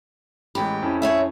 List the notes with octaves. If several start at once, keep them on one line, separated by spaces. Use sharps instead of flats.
A1 G#3 G4 B5
F2 C#4 E4
G#4 C#5 E5